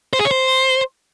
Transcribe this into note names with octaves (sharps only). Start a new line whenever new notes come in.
C5
G#4
C#5
C5